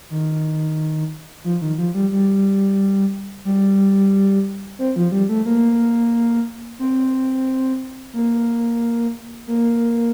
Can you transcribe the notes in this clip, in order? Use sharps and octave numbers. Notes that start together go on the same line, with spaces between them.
D#3
F3
D#3
F3
G3
G3
G3
C4
F3
G3
A3
A#3
C4
A#3
A#3